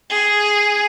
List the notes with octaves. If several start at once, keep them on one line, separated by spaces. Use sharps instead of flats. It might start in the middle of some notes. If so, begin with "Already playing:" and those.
G#4